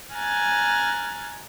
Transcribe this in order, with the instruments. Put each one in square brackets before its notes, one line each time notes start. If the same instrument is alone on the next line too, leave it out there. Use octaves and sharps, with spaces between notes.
[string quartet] G#5 A#5 F6 F#6 G#6 A6